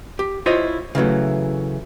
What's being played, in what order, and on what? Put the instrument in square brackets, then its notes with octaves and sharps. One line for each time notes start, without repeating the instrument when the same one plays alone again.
[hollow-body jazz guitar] G4
E4 F4 C5 C#5 D#5
C#3 E3 F#3 A3